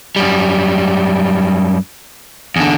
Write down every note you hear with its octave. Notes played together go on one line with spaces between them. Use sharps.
F#2 G3
E2 D3